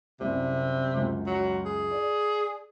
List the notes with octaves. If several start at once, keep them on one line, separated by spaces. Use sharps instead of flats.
C2 F#2 C3
C#2 F#2
F#3
G#4
D5